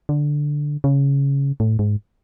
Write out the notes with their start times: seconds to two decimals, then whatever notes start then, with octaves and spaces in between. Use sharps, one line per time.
0.09 D3
0.84 C#3
1.60 A2
1.79 G#2